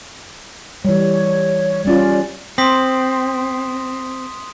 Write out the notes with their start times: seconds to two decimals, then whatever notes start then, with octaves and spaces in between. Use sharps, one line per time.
0.85 E3 G3 C#5
1.85 G3 C#4 F4 D5
2.58 C4 C6 D#6 B6